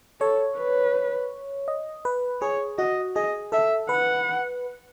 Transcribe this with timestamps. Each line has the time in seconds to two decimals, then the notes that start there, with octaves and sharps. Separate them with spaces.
0.20 A4 C#5
0.57 B4
1.68 D#5
2.05 B4
2.42 G#4 C#5
2.78 F#4 D#5
3.16 G#4 D#5
3.52 A4 E5
3.89 B4 F#5